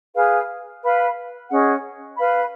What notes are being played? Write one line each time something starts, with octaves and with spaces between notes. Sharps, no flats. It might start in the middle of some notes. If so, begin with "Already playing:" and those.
G#4 B4 F5
B4 F5 B5
C#4 G#4 D#5 F#5
B4 F5 B5